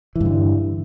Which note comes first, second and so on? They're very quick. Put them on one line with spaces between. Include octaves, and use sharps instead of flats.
E3 G2 D3